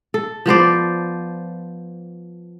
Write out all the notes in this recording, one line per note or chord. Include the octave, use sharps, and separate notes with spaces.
A4
F3 B3 C5 D5